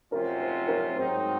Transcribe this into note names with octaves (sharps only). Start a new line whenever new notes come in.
F2 C3 F#3 C#4 F4 A#4
C5
A#4 C#5
G#2 F#3 C4 D#4 C5